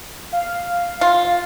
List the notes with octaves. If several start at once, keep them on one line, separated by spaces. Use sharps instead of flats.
F5
F4